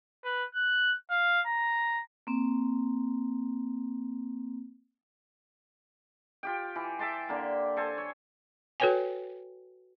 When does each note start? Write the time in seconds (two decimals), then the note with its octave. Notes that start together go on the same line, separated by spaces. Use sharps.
0.24 B4
0.55 F#6
1.10 F5
1.47 A#5
2.27 A#3 C4
6.43 F4 G4 G5
6.76 E3
6.99 E5 G5 A5 C6
7.29 D3 A#3
7.76 A4 C5 G#5
7.98 C#5
8.80 F#4 A4 B4 C#5 G5 G#5